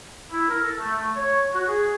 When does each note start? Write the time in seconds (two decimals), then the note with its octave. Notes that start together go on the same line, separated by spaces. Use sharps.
0.31 E4
0.48 A#4
0.63 A4
0.79 A3
1.15 C#5
1.53 F#4
1.68 G#4